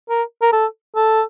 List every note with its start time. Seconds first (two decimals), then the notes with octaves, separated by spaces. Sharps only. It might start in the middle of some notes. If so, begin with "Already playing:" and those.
0.09 A#4
0.42 A#4
0.52 A4
0.96 A4